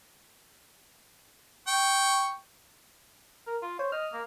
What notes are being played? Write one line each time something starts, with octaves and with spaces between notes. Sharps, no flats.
G5 C#6
A#4
F4
C5 C#5
D#5 F6
A#3